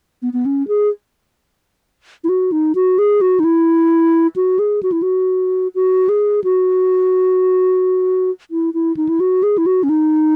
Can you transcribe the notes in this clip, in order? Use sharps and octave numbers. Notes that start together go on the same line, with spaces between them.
B3
B3
C#4
G#4
E4
F#4
D#4
F#4
G#4
F#4
D#4
E4
F#4
G#4
F#4
E4
F#4
F#4
G#4
F#4
E4
E4
D#4
E4
F#4
G#4
E4
F#4
C#4
D#4